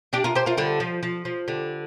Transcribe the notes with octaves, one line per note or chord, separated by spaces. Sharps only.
D4 G4
F4 A#4
G4 C5
F4 A#4
D3 G3
F3
F3
F3
D3 G3